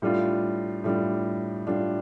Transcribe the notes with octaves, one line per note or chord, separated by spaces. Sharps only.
A2 G3 D4 F4
A2 G3 D4 F4
A2 G3 D4 F4